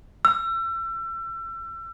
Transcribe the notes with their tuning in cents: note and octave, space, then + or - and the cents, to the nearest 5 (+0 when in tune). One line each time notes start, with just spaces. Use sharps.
E6 +35